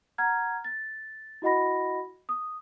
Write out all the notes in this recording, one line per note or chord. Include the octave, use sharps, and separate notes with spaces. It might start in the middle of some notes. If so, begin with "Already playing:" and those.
F#5 A#5 F6 G#6
A6
E4 F#4 D#5 F#5 B5 A#6
D#6